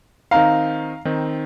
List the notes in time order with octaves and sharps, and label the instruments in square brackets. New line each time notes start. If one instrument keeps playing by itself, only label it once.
[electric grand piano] D#3 C4 D#4 [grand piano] F5 A#5
[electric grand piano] D#3 C4 D#4